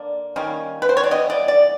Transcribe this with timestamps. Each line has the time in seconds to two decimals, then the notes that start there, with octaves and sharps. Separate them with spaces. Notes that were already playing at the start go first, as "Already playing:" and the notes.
Already playing: D3 A#3 D5
0.36 D#3 G3 A#3 C#4
0.82 B4
0.89 C5
0.97 C#5
1.04 D5
1.11 E3 G3 B3 D#5
1.30 D5
1.48 D5